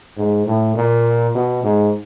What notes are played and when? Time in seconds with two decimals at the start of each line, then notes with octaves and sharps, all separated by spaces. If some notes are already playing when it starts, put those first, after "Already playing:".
0.17 G#2
0.47 A2
0.75 A#2
1.35 B2
1.64 G#2